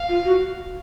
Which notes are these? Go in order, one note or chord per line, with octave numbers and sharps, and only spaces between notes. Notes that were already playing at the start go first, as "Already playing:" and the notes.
Already playing: F5
F4
F#4